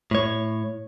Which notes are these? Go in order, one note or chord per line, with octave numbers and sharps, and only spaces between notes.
A2 C#5